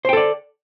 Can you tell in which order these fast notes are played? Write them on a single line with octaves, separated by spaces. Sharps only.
C5 G5 A4 D5